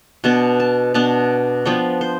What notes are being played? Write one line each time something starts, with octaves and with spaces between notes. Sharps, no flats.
B2 B3 D4 A5
A5
B2 B3 D4 A5
F3 B3 D4 G5
C5